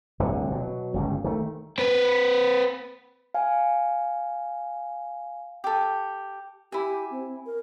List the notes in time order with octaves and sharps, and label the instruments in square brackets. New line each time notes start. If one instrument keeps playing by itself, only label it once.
[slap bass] D1 C2 D3
B2 F#3
G1 C#2 G2
D#3 A3
[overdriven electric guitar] C4 B4
[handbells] F5 G#5
[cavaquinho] G4 A4
[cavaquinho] E4 G#5 [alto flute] G4
[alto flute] C4
A#4